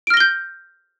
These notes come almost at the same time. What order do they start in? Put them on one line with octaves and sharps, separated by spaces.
D7 F6 A#6 G7 G6